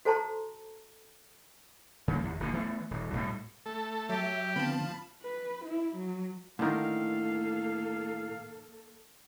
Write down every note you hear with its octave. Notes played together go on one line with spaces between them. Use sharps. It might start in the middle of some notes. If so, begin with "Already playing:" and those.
F#4 A4 C5 A5 A#5 C6
C#3 F3 G#3 A#3
D#2
D1 B1 D3 A#3
E3 A3 B3
D#1
B1 A2 G3
A3 A4
F#3 G4 E5
D3 F3 B3 C4 A5 B5
B4
E4
F#3
A2 D3 D#3 A#3 D4 A4 A#4 F5